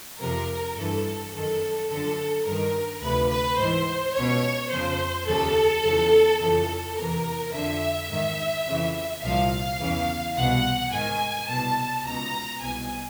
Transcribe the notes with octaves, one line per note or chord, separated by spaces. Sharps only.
F2 C3 F3 A#4
G2 E3 A4
F#2 D#3 A4
F#2 D3 F3 A4
G2 D#3 A#4
D2 C3 F3 B4
B4
G#2 E3 C5
C#2 B2 C#5
F2 C#3 F3 C5
D#2 C#3 F3 A4
E2 C#3 F3
F2 C#3 E3 A4
E2 C3 E3 A#4
F2 D3 F3 E5
G#2 D#3
F2 C#3 E3
C2 A#2 F3 F5
E2 C#3 E3
C2 B2 F#5
G#2 D#3 G#5
C2 B2 A5
C#2 B2 A#5
C2 B2 G#5